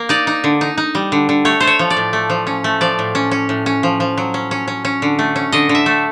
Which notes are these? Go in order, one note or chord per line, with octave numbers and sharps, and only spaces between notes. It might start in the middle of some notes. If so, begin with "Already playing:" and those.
Already playing: A#3
D#4 D5
D#4
D3
D#4
D#4
G3
D3
D3
A3 C#5
A3 C5
C#5
F3
D5
A2
A3
F3
C#4
A3
F3 D5
A2
C#4
C#4
A2
C#4
F3
F3
F#3
C#4
C#4
C#4
C#4
D3
A3
C#4
D3 D#5
D3
E5
A3